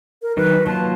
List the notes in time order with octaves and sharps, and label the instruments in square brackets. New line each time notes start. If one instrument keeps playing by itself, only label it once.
[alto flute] A#4
[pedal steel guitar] D#3 F#3 D#4 [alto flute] B4
[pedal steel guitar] F#3 A#3 F4 [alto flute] A5